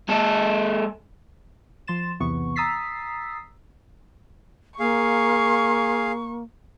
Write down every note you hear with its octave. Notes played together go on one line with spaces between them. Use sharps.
G#3 A4
F3 C6 A6 E7
B1 E2 C3 E3 B3 C#6
A#5 D#6 E6 A6 B6 C7
A#3 G#4 F5 C#6